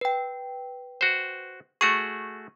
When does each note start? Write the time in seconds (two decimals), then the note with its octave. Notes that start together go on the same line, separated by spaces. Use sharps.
0.01 B4 G5
1.01 F#4 C5
1.81 A3 F#4 G#4 C#6